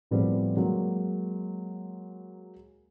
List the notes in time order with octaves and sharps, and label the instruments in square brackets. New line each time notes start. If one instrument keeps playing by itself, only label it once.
[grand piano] A2 F3 G3 B3 C4 G#4
F#3 G#3 A#3